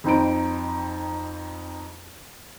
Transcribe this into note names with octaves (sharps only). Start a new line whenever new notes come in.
F2 C4 D#4 B5 D7